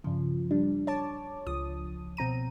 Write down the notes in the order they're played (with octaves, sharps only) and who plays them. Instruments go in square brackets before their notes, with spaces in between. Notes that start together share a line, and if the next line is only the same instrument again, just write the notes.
[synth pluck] G2 C#3 F3
G3 D4
C#5 A5 D6
C#2 F3 D#6
B2 C4 A#5 D#7